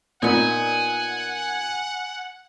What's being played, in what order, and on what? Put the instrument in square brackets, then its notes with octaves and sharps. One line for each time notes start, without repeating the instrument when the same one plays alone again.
[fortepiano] A#2 [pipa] B3 D#4 [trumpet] F#5 [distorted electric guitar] G#5